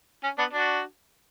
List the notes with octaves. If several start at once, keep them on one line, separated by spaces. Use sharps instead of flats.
C#4
B3 D4
D4 F#4